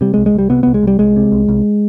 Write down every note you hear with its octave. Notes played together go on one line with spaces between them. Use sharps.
C3 G3
G#3
C2
G#3
C2 G3
C3 B3
C2 B3
G#3
C2 G3
C2 G#3
C3
C2
C2